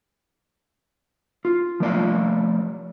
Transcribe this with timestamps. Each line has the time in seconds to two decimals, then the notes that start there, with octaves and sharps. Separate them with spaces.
1.45 F4
1.80 F3 A3 D5 F5